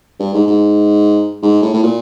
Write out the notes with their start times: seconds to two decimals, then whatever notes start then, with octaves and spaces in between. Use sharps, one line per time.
0.19 G2
0.34 G#2
0.47 G#2
1.42 G#2
1.62 A2
1.73 A2
1.83 A#2